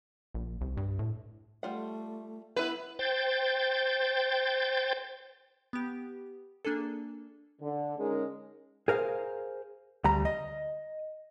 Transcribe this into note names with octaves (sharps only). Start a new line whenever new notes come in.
A#1
C2
G2
A2
G3 A3 F4 F#5
B3 E4 B4
C5 G5 G6 A6
B3 G4
A#3 D4 G#4 A4
D3
G#3 C#4 D#4 G#4 A#4
G#4 A#4 C5 F5
D2 G3 A#5
D#5